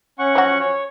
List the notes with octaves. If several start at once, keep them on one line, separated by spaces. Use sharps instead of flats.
C#4 F#5 C#6
F3 F#3 F#4
C#5